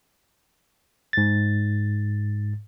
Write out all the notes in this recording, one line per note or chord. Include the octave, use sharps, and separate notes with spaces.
G#2 A6